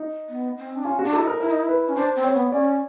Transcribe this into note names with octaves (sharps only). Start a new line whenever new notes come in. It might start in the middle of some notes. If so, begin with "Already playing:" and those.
Already playing: D#4
B3
C4
D4
C#4 F4
D4 F#4
E4 A4
D#4 A#4
E4 A#4
D#4
E4
B4
C#4
D4 C5
C4
C#5
B3
C#4 D5